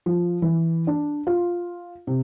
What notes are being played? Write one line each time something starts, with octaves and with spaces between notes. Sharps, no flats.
F3
E3
D4
F4
C3